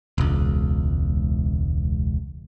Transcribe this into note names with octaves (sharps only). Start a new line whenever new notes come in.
E1 C#2